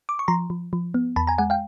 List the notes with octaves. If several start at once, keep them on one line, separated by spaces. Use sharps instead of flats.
D6
C#6
F3 A#5 C6
F3
F3
B3
E2 A5 B5
G#5 A#5
G#3 F#5 G#5
F5 G5